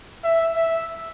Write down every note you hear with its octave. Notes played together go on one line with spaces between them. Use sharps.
E5
E5